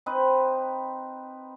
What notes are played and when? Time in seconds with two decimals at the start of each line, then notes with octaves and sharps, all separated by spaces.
0.06 C4 D#4 B4